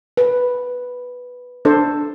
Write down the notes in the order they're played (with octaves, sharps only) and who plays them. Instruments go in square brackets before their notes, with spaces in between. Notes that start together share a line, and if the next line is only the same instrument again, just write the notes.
[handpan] B4
[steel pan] D4 A4 C5